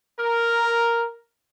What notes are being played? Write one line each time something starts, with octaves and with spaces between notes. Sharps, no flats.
A#4